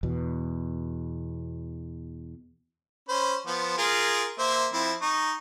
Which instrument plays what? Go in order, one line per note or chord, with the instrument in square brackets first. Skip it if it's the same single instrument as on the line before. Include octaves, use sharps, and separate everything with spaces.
[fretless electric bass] E2 B2
[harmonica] C#4 C5 B5
F3 B3 C5
F4 G#4 A#4
A#3 C5 E5
F3 C4 E4
D#4 C#6